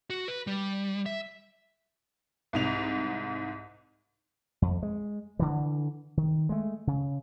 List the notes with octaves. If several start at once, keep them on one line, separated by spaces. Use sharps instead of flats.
F#4
B4
G3
E5
C2 G#2 F7
F2
G#3
D3 E3
D#3
G#3 A3
C#3